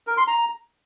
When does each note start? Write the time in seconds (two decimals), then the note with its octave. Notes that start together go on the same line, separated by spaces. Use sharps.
0.07 A#4
0.17 C6
0.28 A#5